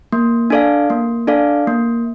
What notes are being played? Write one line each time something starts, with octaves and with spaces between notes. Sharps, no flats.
A#3
D4 A4 D5 F5
A#3
D4 A4 D5 F5
A#3